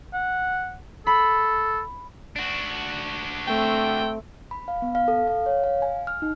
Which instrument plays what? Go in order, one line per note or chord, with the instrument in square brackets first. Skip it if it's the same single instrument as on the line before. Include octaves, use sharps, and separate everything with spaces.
[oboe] F#5
[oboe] A4 [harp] B5
[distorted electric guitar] D4 F#4
[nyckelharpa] A3 C4 [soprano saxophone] G5
[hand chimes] B5
F5
B3
F5
A4
F5
C#5
F5
G#5
F6
D#4